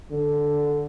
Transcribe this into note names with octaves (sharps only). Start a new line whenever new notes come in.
D3